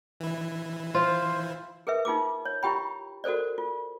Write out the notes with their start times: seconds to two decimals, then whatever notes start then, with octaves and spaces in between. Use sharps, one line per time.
0.20 E3 E4
0.95 F4 C5
1.87 G#4 A#4 B4 E5
2.05 D#4 F4 G#4 D6
2.45 C#5
2.63 E4 F4 G4 G5 B5
3.24 F#4 A4 A#4 C5 D5
3.58 F4